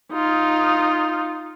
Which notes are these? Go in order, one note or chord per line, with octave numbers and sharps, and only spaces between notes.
D#4 F4